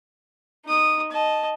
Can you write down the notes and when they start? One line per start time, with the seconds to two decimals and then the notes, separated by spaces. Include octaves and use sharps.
0.66 D#4 D#6
1.12 D#5 A5